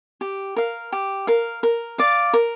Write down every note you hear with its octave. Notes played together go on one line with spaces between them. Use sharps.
G4
A#4 F5
G4
A#4 F5
A#4
D5 F5
A#4